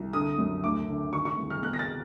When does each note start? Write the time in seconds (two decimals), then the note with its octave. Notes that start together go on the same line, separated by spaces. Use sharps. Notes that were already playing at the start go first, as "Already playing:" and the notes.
Already playing: C2
0.13 D3 D#6
0.38 F#2
0.63 D2 D6
0.88 D3
1.13 D#3 C#6
1.25 C#6
1.38 C2
1.50 F6
1.63 B2 F#6
1.73 A#6
1.79 A6